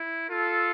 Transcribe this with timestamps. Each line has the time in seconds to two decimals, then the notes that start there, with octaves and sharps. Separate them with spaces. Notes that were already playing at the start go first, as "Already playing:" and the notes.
Already playing: E4
0.30 F4 A4